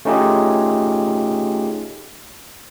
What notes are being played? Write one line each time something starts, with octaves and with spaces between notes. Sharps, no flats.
A3 C#4 D#4 F4 G4 G#4